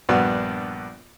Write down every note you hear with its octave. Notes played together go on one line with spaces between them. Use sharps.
A#1 G2 B3 F#4